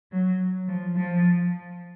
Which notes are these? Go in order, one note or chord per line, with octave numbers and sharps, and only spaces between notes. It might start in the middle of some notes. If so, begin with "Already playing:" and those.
F#3
F3
F3